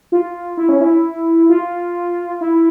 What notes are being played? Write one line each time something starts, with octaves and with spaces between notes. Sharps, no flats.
F4
E4
C#4
E4
F4
E4